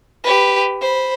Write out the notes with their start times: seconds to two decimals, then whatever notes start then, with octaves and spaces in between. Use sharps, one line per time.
0.24 G4 B4
0.81 C5 B5